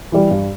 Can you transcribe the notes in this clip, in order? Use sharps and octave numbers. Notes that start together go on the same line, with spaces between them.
E3 G3
G2